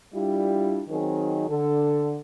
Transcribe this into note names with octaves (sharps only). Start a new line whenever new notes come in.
G3 D4 E4 F4 G4
D#3 F#3 C4 D#4 G#4 A#4
D3 A4